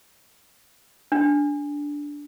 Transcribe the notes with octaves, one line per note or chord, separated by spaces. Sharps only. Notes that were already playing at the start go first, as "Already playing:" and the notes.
D4